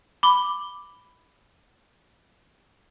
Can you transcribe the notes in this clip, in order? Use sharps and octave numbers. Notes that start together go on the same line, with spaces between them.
B5 D6 G7